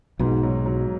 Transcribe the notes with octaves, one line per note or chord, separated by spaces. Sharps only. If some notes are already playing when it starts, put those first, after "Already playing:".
B1 G#2 B2
F#3
F#3